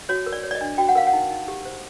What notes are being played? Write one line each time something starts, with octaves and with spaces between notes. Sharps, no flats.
F#4 C#5
A#4
D5
C#5
D5
D#5
D4
F#4 G5
F#5
A#4 F5
F#5
D#4
D#4
G4
C5